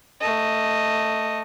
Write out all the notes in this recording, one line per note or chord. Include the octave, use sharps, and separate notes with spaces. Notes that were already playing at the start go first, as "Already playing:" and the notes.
A3 D#5